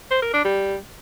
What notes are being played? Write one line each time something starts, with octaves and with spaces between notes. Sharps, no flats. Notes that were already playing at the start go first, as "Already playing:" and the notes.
C5
A#4
D4
G3